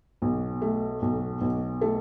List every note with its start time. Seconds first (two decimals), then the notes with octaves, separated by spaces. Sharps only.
0.22 B1
0.62 A3
1.02 B1
1.41 B1
1.81 A3 A4